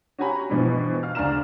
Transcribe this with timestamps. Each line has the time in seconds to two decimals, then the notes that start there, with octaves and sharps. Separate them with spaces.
0.19 C#4 F#4 G4 G#5 A#5 B5
0.50 G2 B2 E3 F3
1.03 F5 F6
1.15 D2 C#3 D4 A#5 F6 E7